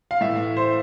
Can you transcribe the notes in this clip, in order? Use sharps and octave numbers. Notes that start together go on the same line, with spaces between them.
F5
A2 E3 E5
C5